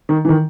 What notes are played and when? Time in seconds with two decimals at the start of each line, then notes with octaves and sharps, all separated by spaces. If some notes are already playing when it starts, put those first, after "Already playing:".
0.09 D#3
0.25 E3
0.29 D#3